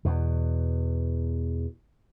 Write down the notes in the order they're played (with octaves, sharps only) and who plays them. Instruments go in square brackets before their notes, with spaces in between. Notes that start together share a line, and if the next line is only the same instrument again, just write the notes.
[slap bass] E2 B2